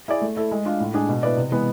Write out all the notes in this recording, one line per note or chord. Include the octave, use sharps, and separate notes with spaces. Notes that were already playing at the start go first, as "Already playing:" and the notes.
E4 G#4 D5
A3
E4 A4
G#3
D4 F4
A2
G#3 D4 G#4
B2
B3 E4 B4 D5
C3
E3 G#3 B3